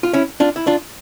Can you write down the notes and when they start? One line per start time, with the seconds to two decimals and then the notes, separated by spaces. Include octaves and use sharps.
0.03 F4
0.13 C#4 E4
0.40 D4 F4
0.56 E4
0.67 D4 F4